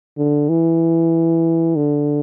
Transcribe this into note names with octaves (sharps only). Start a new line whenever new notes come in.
D3
E3
D3